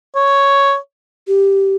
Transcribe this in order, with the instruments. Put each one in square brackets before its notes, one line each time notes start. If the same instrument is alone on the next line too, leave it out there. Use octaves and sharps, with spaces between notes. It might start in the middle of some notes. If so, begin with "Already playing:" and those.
[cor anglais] C#5
[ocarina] G4